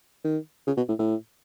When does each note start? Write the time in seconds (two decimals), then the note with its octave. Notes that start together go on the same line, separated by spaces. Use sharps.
0.25 D#3
0.67 C#3
0.77 B2
0.89 A2
0.99 A2